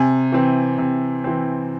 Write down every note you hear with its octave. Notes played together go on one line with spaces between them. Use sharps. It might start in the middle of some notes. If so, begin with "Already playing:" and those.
Already playing: C3 G#5
E3 C4
C3
E3 C4